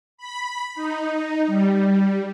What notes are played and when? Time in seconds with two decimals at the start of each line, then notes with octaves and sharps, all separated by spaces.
0.17 B5
0.75 D#4
1.47 G3